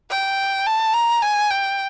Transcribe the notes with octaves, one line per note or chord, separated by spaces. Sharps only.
G5
A5
A#5
G#5
G5